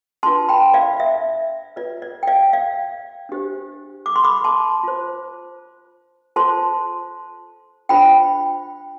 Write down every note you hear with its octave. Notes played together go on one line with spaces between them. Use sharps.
D4 F4 B4 A5 C6
G5 B5
D5 F5
E5
F4 B4 D5
D5
G5
D5 F5
D5 F5
D4 G4 C5
D6
C6
B5 D6
A5 C6
F4 C5
F4 A4 C5 A5 C6
D4 F4 C5 G5 B5